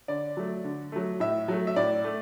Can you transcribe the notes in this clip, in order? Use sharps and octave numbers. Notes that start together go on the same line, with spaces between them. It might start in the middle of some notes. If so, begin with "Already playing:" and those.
D3 D5
F#3 A3
D3
F#3 A3
A2 E5
F#3 A3
E5
A2 D5
A3